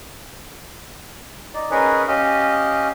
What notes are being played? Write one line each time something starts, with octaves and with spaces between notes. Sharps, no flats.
D#4 D5
C#4 D#4 G#4 A#4 B4 C#5
C#4 G4 D#5 F5